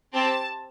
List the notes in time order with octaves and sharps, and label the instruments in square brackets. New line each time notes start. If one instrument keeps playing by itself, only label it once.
[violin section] C4 G4 A5